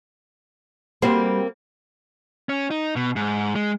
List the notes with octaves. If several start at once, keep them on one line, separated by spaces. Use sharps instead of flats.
G3 A#3 C4 F#4 C5
C#4
D#4
B2
G#2
G#3